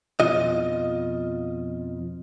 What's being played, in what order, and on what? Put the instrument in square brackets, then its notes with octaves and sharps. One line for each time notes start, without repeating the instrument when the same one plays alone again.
[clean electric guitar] F2 B2 F4 D#5